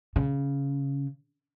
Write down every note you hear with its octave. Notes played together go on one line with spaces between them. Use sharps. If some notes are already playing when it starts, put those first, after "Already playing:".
C#3